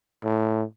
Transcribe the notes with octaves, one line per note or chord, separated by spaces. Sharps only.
A2